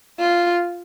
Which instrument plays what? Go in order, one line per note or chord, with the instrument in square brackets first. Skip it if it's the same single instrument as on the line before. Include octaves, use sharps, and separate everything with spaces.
[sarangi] F4